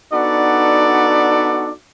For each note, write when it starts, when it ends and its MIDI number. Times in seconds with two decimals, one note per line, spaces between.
0.12 1.71 59
0.12 1.71 62
0.12 1.71 63
0.12 1.71 66
0.12 1.71 69
0.12 1.71 74